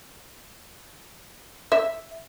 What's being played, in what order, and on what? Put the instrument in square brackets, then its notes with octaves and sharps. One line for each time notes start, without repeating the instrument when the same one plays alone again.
[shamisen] E5